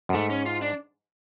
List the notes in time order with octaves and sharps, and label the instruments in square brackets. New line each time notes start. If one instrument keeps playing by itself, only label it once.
[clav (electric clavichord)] F#2
[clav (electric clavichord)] G#2 [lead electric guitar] A3
[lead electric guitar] C#4
F4
D4